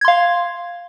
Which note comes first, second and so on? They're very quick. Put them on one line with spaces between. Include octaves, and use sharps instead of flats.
G#6 C6 F5